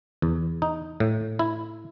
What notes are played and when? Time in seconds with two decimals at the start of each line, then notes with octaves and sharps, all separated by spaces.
0.22 E2
0.62 D#4
1.00 A2
1.39 E4